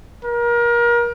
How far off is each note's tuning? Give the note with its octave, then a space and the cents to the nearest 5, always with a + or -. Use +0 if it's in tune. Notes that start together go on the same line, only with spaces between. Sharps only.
A#4 +30